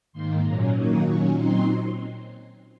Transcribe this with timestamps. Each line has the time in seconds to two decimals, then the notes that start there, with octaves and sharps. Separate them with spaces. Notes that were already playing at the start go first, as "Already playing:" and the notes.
0.13 G#2 D#3 A#3 C6
0.43 A#2 F#3 C#4 A#5
0.75 D#3 F#3 A#3 D#4 G#5
1.05 A#2 F#3 C#4 C#6
1.35 A#2 F#3 C4 D#4 C6